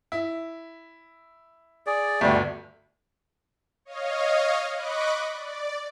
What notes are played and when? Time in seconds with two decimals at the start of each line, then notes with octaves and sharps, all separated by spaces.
0.12 E4
1.87 G#4 D5
2.21 G1 D2 G3 A3
3.85 C#5 D#5 F5
4.74 D#5 B5 C#6 D6 F#6
5.32 D5